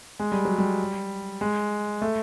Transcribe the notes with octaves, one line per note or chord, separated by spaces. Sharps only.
G#3
G3
F#3
G3
G#3
A3